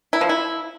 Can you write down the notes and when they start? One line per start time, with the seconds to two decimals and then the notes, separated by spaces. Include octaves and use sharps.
0.13 E4
0.21 F3
0.29 E4